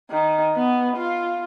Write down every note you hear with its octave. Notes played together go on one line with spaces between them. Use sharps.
D#3
B3
F4